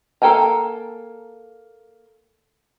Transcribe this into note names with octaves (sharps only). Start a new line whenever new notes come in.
A#3 A4 G5 G#5 A#5